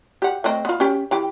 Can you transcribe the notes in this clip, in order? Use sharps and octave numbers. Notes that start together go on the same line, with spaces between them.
G4 F#5
A3 C4 D#5
B3 F4
C#4 G4
E3 G4 G5